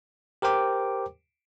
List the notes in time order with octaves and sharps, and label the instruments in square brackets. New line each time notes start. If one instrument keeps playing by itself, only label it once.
[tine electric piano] G4 A#4 C5 G5 D6